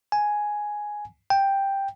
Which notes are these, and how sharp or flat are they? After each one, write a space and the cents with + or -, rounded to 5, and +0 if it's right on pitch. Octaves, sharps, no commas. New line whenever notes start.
G#5 +5
G5 +5